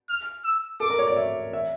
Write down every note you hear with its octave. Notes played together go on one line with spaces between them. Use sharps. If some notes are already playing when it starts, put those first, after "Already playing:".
F6
E6
A4 D6
A#4
C#5
D5
E5
E5